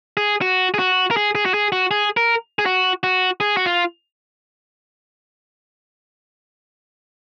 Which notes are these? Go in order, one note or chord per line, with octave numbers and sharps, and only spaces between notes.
G#4
F#4
G#4
F#4
A#4
G#4
G#4
F#4
G#4
F#4
G#4
A#4
G#4
F#4
F#4
G#4
F#4
F4